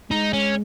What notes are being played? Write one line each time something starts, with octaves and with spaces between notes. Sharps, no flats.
G#3 D#4
C#4